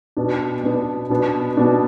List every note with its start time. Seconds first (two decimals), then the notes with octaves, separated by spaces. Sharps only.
0.17 B2 B3 D4
0.64 B2 B3 D4
1.10 B2 B3 D4
1.57 B2 B3 D4